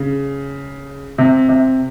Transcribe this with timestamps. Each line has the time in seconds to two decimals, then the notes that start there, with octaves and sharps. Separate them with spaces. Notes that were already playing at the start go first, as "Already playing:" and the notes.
Already playing: C#3
1.18 C3
1.49 C3